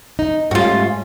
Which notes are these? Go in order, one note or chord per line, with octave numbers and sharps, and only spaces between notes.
D#4
G#2 G3 A3 C#4 F4 F#4